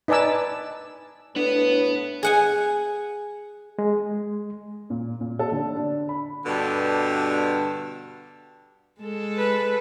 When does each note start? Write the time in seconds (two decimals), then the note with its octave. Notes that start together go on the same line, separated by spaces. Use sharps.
0.08 D#4 B4 D5 G#5 A5 E6
1.36 A2 B3 D4 B4
2.23 G#4 F#5 G#5
3.79 G#3
4.90 A#2
5.21 A#2
5.39 A4
5.52 D3
5.76 D4
6.09 B5
6.46 G2 B2 D3
9.01 G#3 A4
9.37 B4